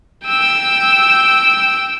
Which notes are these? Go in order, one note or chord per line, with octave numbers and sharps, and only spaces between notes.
G5 E6